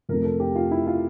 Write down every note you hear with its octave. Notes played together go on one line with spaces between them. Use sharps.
F2 C3 F3 A3 A#4
A4
G4
F4
E4
F4